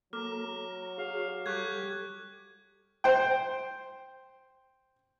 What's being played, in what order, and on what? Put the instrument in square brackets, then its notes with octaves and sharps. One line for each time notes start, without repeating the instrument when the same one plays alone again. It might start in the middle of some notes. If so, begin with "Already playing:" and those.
[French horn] F#3 [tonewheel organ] A#3 A4 A#5 [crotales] D6 F6
[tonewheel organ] A#5
[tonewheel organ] F#4 G#4 C#5 [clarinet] F5
[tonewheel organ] G3 A4 [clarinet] G4 [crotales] C#6 F#6 G#6
[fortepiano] C5 G5